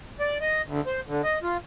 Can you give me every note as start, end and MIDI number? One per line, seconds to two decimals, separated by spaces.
0.20 0.38 74
0.41 0.62 75
0.67 0.81 38
0.86 1.00 72
1.08 1.22 50
1.24 1.39 75
1.43 1.57 65